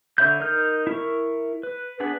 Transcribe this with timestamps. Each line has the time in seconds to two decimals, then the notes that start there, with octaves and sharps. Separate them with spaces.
0.18 D3 C#5 E5 B5 G6
0.40 D#4 A#4 F6 G6
0.87 E4 A#4 C#6
1.63 B4
2.00 B3 D4 G#4 B4 F#5